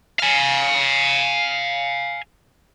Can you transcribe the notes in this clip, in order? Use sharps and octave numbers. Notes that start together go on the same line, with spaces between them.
F5 G#5